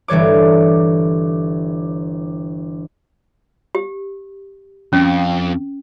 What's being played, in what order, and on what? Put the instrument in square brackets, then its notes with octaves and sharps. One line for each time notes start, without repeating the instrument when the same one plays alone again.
[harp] G1 E3 G3 C#5 D6
[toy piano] G4
[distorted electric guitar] F2 [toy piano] C#4